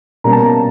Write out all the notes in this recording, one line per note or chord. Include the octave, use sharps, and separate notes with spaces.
B2 G3 A#3 C#4 A#5
A5
A#5